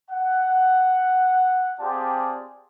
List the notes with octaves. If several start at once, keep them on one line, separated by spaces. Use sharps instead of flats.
F#5
C4 F4 G4 G#4 D5 A5